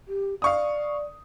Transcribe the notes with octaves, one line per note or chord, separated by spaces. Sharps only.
G4
D5 F5 C#6 D#6